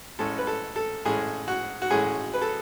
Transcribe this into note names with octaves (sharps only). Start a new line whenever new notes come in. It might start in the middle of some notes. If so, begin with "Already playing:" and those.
A1 A2 G#3 C#4 A4
B4
A4
A4
A1 A2 G#3 C#4 G#4
F#4
F#4
A1 A2 G#3 C#4 G#4
B4
A4